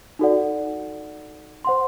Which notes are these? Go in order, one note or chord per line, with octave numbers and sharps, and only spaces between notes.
D#4 F#4 A4 D5 F#5
C5 F#5 C6